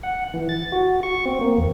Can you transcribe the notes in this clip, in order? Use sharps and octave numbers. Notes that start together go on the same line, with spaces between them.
F#5
E3
A6
F#4
C#6
C4
A#3
E2